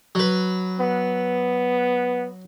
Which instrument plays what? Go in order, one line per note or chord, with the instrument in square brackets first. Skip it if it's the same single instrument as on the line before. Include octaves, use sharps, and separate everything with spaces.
[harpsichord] F#3 B4
[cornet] B3